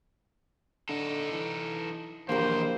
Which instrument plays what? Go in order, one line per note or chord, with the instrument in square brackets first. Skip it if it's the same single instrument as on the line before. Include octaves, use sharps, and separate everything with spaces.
[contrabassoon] D3 [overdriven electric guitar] D#4 A4
[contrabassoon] E3
[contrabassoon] A#1 [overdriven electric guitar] D#2 E3 [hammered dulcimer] A#3 G4 A#4 [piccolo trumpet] C5